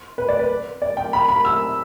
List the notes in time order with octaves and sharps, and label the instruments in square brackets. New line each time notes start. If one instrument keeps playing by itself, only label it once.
[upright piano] B4
D5
B4
D5
G5
B5
B5
E6